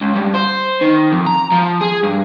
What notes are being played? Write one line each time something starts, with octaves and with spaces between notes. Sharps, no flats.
C#2
G2
C5
D#3
F2
A#5
F3
G#4
G2